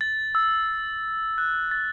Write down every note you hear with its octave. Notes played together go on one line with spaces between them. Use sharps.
A6
E6
F#6
A6